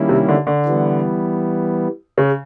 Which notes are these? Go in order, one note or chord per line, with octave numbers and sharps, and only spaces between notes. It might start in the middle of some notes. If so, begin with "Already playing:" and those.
Already playing: D#3 G3 A#3 C#4 E4
C3
D3
D3
E3 G3 B3
C#3